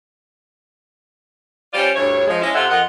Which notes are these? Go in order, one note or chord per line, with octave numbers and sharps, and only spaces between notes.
G3 C#4 F4 C5 D5
D2 G2 E4 C#5
F3 G#3
G#3 C#4 E4
C3 F4 A4 C5 E5 F#5
F2 F4 A#4 D#5 F#5